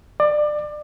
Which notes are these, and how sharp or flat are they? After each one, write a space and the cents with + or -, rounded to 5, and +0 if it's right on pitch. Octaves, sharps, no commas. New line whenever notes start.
D5 +25